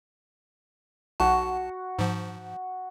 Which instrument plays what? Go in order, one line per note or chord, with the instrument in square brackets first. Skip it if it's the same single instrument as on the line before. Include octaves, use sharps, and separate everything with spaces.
[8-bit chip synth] B1 A5 [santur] F#4 F#5
[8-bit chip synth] G#2 F3